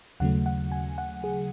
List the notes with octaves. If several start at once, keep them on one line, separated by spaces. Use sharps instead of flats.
D#2 C#3 F#3 A3 F#5
F#5
G#5
F#5
G#4